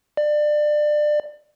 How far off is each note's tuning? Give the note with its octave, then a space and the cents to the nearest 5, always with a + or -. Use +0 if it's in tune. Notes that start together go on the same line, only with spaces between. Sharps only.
D5 +25